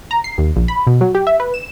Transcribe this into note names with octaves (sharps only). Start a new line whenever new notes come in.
A#5
C7
D#2
A#1
B5
B2
F#3
G4
E5
B4
E7